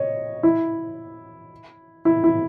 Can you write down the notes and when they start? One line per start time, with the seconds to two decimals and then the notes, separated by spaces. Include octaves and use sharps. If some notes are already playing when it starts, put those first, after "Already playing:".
Already playing: C#5 D#5
0.43 E4
2.05 E4
2.24 E4